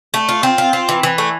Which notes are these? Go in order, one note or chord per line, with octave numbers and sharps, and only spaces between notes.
A3
F4
C4
F4
C4
E3
E3
A3